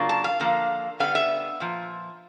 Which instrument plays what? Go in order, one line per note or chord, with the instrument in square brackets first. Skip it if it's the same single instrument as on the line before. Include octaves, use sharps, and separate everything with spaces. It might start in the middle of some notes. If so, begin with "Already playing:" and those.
Already playing: [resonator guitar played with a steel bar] C#3 F#3 A#3 D4 F4
A5
F5
D3 F3 A#3
D3 G3 B3 F5
E5
A#2 F3